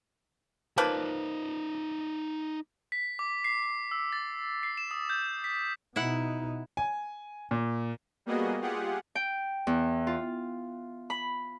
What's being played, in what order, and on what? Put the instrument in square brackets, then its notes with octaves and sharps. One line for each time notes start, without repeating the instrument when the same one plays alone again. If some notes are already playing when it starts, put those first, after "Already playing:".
[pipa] F3 A#3 B4 [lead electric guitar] D#4 D5
[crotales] B6
D6
C7
C7
E6
A6
C7
E7
D#6
G6
B6
[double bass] B2 D#4 [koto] E4 F#5
[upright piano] G#5
A#2
[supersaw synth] G3 A#3 B3 F#4 G#4 D#5
F4 G4 G#4 F#5
[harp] G5
E2
F4
B5